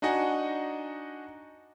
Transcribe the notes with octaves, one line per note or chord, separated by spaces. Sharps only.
D4 D#4 F#4 D#5 F#5 G#5